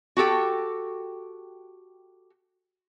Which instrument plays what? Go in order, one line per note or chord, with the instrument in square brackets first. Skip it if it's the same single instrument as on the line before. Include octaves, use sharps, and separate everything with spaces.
[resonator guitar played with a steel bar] F#4 G4 A4 G5